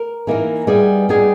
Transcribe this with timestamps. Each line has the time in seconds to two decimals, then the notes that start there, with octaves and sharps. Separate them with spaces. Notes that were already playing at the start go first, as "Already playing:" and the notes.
Already playing: A#4
0.27 E3 A#3 D#4 A#4
0.67 G3 B3 D#4 G#4
1.09 G3 B3 D#4 G#4